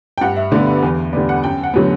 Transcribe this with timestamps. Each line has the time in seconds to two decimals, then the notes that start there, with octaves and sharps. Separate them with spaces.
0.18 G5
0.21 G2 F#5
0.36 E5
0.52 D3 G3 B3 D5
0.67 B4
0.82 E2 B4
1.13 D3 G3 B3 D5
1.29 F#5
1.44 F#2 G5
1.63 F#5
1.74 D3 F#3 B3